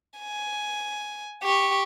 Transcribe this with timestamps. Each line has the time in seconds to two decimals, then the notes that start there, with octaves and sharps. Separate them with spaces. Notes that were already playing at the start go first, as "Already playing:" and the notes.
0.19 G#5
1.43 G4 C#6